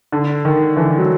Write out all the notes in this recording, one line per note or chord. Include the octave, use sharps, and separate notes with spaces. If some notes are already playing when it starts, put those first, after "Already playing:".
D3
D#3
D3 E3
F#3